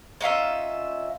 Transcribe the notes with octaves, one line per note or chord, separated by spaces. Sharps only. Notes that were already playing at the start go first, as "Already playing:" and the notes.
C#4 D#4 F4 E5